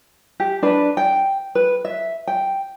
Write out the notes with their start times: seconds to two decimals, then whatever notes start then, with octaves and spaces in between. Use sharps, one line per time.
0.40 G4
0.63 D4 B4
0.97 G5
1.55 B4
1.85 E5
2.27 G5